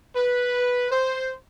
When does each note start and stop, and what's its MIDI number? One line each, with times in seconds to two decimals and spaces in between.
0.16 0.87 71
0.91 1.34 72